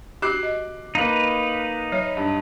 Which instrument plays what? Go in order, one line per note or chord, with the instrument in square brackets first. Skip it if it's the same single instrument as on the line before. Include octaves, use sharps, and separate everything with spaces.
[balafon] F#4 G4 [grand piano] D6 F#6 C7
[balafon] D#5
[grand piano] A#3 F5 [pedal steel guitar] D#4 B4
[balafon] F#3 C#5
[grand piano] G2